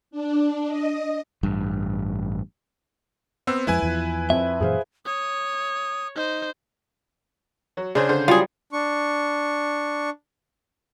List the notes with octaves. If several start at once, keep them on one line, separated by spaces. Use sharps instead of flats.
D4
D#5
A1 G2
B3 C4 E6
F2 F3 G#3 E4 B4 G#5
E2 E3 F3
F2 E5
F#2 A#2 E3 G#4 C5 F5
C#5 D#6
D#4 C5
F#3
C#3 D4 G#4 C5
D3 C5
F#3 G3 F4 G#4
D4 C#6